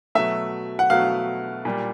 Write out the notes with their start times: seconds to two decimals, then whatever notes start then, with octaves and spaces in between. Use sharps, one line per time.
0.15 B2 F#3 A3 E5
0.79 F#5
0.90 B2 F#3 A3 F5
1.65 A#2 G3